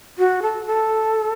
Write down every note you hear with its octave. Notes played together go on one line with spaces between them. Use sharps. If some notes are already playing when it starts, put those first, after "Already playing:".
F#4
A4
A4